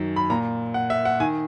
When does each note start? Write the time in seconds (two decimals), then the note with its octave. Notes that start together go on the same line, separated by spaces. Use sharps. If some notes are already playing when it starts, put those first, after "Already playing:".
Already playing: F#2 D#3
0.16 B5
0.30 A#2 A#5
0.74 F#5
0.90 E5
1.05 F#5
1.20 D#3 G#5